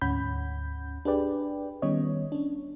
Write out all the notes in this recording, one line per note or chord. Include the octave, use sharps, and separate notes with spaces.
D2 G#2 C#4 F#5 B5 G6
D4 G4 G#4 B4 D5 G5
D#3 G3 B3 C#4 C#5 D#5
C#4 D4